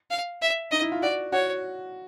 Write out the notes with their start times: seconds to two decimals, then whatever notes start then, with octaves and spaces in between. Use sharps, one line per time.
0.10 F5
0.42 E5
0.71 D#4 D#5
0.81 E4
0.92 F4
1.02 F#4 D5
1.32 F#4 C#5